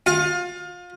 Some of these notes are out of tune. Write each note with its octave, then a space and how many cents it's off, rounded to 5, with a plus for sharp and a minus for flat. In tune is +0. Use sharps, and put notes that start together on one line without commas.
F4 +30 F5 +25